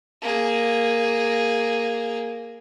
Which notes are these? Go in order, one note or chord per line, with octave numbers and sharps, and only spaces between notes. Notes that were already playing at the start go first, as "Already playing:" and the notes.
A#3 G#4